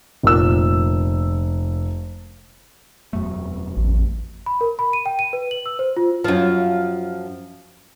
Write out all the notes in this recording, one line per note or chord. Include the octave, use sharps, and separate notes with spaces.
F1 A#2 E6
E1 F#2 A3
A1
B5
A#4
B5
D#7
G5
D#7
B4
F#7
E6
C5
F4
F#2 F3